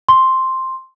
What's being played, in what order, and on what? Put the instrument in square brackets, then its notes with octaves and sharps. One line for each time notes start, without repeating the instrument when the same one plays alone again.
[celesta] C6